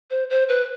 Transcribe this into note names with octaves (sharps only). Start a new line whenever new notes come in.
C5
C5
B4